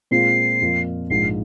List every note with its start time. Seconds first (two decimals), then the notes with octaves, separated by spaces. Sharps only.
0.11 A#2 G#3 C4 F4 C7
0.61 F2 F3 A#3 F4
1.10 A#1 G#2 F3 C7